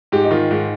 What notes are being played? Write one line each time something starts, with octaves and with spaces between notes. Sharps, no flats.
G#2 G4
D#4
D#3 F4
G#2